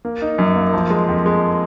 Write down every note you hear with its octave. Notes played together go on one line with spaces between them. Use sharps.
A#3
D#4
F#2
A#3
F3
G#3
F2
G#3